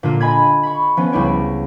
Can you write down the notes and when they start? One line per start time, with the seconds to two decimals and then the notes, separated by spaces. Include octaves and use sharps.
0.03 A#2 D3 A#3 F4
0.21 D#5 G#5 B5 G#6
0.63 B5 C#6
0.97 F3 B3 C#4
1.12 C#2 G3 E4 G4 C#5 D7